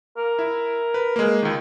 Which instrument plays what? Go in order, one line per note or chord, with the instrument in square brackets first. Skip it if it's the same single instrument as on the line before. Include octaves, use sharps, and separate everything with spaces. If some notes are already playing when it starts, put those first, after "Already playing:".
[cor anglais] A#4
[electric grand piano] E4
B4
G#3 A#3
C#2 D#3